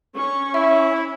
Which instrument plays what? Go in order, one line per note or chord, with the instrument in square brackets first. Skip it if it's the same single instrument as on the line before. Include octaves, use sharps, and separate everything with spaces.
[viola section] C#4 [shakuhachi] C#6
[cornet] E4 [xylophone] E5